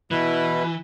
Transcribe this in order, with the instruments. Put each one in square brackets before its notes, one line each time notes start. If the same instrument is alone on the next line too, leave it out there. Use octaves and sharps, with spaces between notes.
[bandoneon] B2 E4 B4 [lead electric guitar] E3